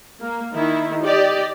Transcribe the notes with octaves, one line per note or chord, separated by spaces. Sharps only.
A#3
D#3 E4
G4 D5 D#5